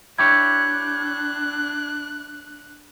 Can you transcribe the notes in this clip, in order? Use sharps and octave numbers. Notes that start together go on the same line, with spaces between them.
D4 E4 G4 C#5 F#6 G#6